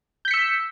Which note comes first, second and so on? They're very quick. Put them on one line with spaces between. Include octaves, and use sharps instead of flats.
G6 B6 C#7 E6